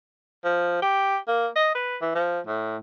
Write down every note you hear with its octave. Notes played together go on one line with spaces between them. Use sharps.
F3
G4
A#3
D#5
B4
E3
F3
A2